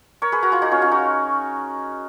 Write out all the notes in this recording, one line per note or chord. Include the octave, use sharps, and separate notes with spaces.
A#4 C#5
G#4 B4
F#4 A#4
F4 G#4
D#4 F#4
C#4 F4
C#4 F4
D#4 F#4